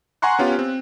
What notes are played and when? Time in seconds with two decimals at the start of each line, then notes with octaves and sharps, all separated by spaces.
0.22 F#5 G#5 A#5 C6 C#6 F#6
0.39 B3 C#4 F4 G4
0.59 C4